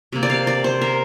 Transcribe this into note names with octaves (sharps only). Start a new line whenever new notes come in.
C3 A#3
D5
F5
D5
C5
A#4